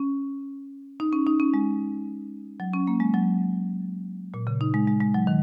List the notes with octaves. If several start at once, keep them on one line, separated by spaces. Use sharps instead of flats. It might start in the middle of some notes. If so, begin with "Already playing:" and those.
Already playing: C#4
D#4
C#4
D#4
C#4
G#3
F#3
C#4
A#3
G#3
F#3
A#2
C#3
D#4
G#3
G#3
G#3
F#3
D#3